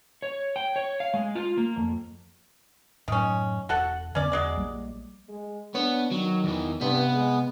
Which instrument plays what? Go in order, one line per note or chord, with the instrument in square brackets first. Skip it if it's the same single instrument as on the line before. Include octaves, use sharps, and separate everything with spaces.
[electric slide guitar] C#5
G5
C#5
F5
G#3
F4
A#3
F2
[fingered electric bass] F#2 A2 F#3 [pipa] D#3 C#4
[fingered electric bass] E1 [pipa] F#4 A4 F#5
[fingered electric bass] F2 D3 B3 [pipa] C#4 D5
[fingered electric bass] E2 [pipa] F#3 G#3 D5
[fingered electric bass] A#1 G3 A#3
[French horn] G#3
[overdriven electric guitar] B3 [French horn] D4 [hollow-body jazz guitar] C#5
[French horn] D#3 [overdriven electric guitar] F#3
[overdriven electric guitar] E2 E3
[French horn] G2 [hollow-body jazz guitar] C3 [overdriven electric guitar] B3
[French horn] G#3